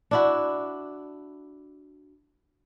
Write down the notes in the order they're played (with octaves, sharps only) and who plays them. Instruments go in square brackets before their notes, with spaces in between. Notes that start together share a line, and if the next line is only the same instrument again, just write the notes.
[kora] D4 E4 F#4